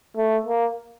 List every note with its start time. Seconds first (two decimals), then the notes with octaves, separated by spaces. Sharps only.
0.17 A3
0.46 A#3